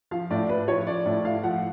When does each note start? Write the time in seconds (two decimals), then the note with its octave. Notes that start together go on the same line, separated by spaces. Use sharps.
0.11 F3 F5
0.30 A2 D5
0.49 A2 B4
0.67 F3 C#5
0.87 F3 D5
1.06 A2 D5
1.24 A2 F5
1.43 F3 F#5